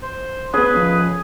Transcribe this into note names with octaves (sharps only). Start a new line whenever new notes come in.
C5
B3 C#4 G#4 B4
F3 C#4